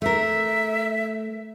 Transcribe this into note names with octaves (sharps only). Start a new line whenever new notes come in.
A3 A#4 E5